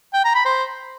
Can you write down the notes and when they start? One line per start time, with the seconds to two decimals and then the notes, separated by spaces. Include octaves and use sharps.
0.14 G5
0.24 A#5
0.35 B5
0.45 C5